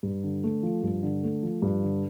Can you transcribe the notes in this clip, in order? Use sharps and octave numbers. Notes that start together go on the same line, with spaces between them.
G2
D3
A3
F3
G2
D3
A3
F3
G2
D3